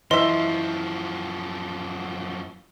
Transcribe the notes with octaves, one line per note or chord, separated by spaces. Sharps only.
F#2 E3 F3 D#5 E5 C6